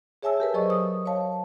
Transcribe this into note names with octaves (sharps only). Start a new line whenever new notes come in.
G#4 C#5 E5 G#5 A5 E6
G4 A#4 B4
F#3 G#4 C5 D5 D#5 C#6
D#6
C#5 F5 A5